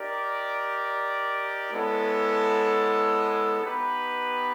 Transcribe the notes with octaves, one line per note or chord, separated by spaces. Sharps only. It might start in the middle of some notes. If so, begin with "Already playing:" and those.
Already playing: D#4 G4 A#4 D5
G#3 B3 E4 A4 C#5
B3 D#4 G4 B4